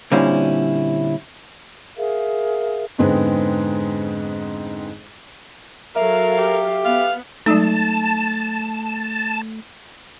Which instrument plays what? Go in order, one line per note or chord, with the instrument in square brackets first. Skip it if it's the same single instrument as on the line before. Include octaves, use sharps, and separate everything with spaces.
[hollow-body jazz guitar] A#2 D3 G3 C4 C#4 E4
[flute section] G#4 A#4 E5 F5
[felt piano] F2 G#2 D3 G#3 B3 C4
[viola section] F#3 A4 F5 [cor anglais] A#4 [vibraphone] E5
[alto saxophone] G4
[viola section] B3 [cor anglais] F5
[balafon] F#3 G#3 D#4 [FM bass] A3 [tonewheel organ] A5